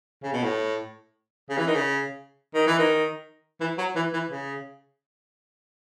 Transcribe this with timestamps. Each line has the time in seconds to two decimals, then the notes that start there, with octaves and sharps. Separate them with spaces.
0.23 C#3
0.33 B2
0.43 A2
1.50 C#3
1.58 E3
1.67 D#3
1.75 C#3
2.54 D#3
2.67 E3
2.79 D#3
3.61 E3
3.78 F#3
3.96 E3
4.13 E3
4.32 C#3